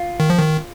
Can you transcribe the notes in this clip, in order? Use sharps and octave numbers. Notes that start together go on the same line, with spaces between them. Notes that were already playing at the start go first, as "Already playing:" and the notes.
Already playing: F4
D#3
F3
D#3